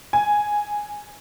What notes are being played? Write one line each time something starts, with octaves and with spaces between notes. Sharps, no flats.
G#5